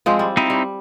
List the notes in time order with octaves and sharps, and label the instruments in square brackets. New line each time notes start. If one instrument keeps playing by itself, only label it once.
[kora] F3 G#3 C4
G3
[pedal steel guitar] C4 D#4 E4
[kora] G3